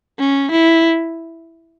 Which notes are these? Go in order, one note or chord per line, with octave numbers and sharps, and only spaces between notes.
C#4
E4